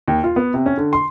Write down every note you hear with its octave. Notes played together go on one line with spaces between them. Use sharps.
D#2
F4
B3
C3
C#4
D3
C6